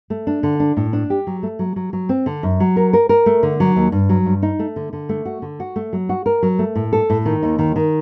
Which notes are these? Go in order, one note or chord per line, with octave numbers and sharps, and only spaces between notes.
A3
D4
D3
D4
A2
D4
G4
F#3
A3
F#3
F#3
F#3
C4
D3
F#2
F#3
A#4
A#4
A#4
A3
D3
F#3
D#2
G2
F#3
G2
D#4
A3
D3
D3
A3
F#4
D3
F#4
A3
F#3
F#4
A#4
F#3
A3
A2
A4
A2
D#3
D#2
D#3
D#3